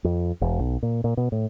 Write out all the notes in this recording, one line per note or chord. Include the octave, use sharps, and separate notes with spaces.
F2
E1
B1
A#2
A#2
B2
A2